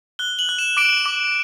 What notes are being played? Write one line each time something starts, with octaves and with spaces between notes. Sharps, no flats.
F#6 G7
F#7
F#6
E7
D6 D7
D6